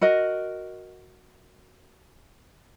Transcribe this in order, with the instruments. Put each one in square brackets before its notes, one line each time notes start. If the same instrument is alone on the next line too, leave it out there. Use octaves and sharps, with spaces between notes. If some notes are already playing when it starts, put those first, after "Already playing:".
[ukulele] F#4 A#4 D#5